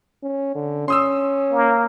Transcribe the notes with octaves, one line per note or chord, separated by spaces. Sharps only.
C#4
D3
C#4 C6 D#6 E6
A#3